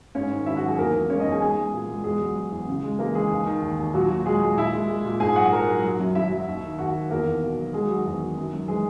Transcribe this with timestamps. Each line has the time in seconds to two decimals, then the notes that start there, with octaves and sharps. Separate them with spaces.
0.15 G#2 C#4 C#5
0.31 D#3
0.46 G#2 E4 E5
0.56 F#4 F#5
0.62 F#3
0.68 G#4 G#5
0.78 E2 A#3 A#4
0.94 E2
1.09 G#3 C#4 C#5
1.20 D#4 D#5
1.26 E2
1.31 G#4 G#5
1.41 G#3 G#4 G#5
1.57 G#3
1.73 A#2
1.88 G#3
2.04 E2 G#3 G#4
2.20 F#3
2.36 F#3
2.52 E2
2.67 C#3
2.83 G#3
2.99 E3 A#3 A#4
3.15 E3 G#3 G#4
3.31 D#2
3.46 D#3
3.62 D#2
3.79 D#2
3.94 A#2 F#3 F#4
4.10 A#2
4.26 G#3 G#4
4.42 G#3
4.57 A#2 E4 E5
4.73 G#3
4.89 G#3
5.05 A#2
5.20 G#2 G#4 G#5
5.36 F#3 F#4 F#5
5.53 F#3 A#4 A#5
5.68 F#3
5.84 F#3
6.00 F#2
6.15 F#2 E4 E5
6.31 F#3
6.48 D#2
6.63 D#3
6.79 D#2 F#4 F#5
6.95 D#3
7.10 E2 A#3 A#4
7.26 E2
7.42 B2
7.58 F#3
7.73 F#3 G#3 G#4
7.89 D#3 F#3 F#4
8.06 E2
8.21 D#3
8.37 F#2
8.53 F#2
8.68 E3 G#3 G#4